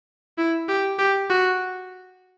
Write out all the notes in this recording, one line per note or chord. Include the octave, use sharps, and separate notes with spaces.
E4
G4
G4
F#4